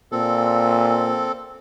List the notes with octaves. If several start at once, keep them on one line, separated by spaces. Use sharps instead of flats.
A#2 C4 A4